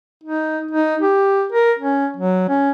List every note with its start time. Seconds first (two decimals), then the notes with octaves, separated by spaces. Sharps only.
0.23 D#4
0.71 D#4
1.01 G4
1.52 A#4
1.79 C#4
2.16 F#3
2.49 C#4